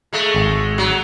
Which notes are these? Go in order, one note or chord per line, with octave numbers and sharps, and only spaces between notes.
G#3 A3
G#1
F#3